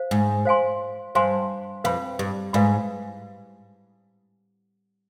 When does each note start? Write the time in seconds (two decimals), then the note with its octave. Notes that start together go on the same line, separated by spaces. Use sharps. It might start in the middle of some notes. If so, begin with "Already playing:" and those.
Already playing: C5 F5
0.11 G#2
0.45 C5 F5 G#5 C6
1.15 G2 C5 F5 G#5 C6
1.84 F2 B4 F5 B5
2.19 G2
2.53 G#2 B4 F5 B5